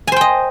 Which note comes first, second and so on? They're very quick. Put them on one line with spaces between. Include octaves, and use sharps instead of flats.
G#5 C5 G5 D#5